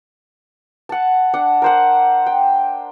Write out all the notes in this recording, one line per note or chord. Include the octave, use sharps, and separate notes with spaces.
F#5 A5
D4 F#5
A#4 C5 F#5
G5